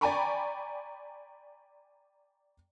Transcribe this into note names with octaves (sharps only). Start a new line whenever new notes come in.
D5 G5 G#5 A#5 B5 C#6